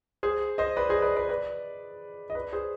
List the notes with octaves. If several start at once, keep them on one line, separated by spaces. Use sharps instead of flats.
G#4 C5
C5 D#5
B4 D5
G#4 C5
B4 D5
B4 D5
B4 D5
D#5
B4 D5
G#4 C5